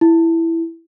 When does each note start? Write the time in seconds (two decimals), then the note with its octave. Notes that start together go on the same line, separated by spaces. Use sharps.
0.01 E4